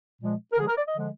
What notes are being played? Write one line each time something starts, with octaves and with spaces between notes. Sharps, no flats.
A#2 F3 G#3
A#4
D3 F3 G#3 G#4
A#4
D5
D#5
D3 F3 G#3